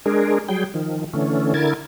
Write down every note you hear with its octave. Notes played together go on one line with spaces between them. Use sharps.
G#3 D4 G#4 A#4
F#3 G3 G#4 G5
D#3 F3
D3 E3 A3 C#4
D3 E4 A#4 G#6 A6